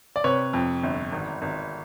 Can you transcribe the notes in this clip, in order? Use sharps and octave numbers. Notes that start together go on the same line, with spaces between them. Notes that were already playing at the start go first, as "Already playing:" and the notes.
D5
C3 B4 C#5
F2
G1
G#1
G#1